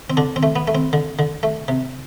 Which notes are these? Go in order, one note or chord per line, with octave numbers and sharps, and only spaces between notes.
C4
D3 D4
C4
A3
B3
A3
C4
D3
D3
A3
C3